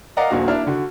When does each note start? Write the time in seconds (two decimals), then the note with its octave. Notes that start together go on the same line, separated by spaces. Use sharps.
0.17 A#4 D5 D#5 F5 F#5 A#5
0.30 D#1 A#1 A#2 F#4
0.48 A#3 D4 E4 F6
0.67 D3 F#4